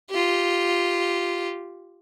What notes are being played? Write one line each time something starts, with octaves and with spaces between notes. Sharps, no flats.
F4 G4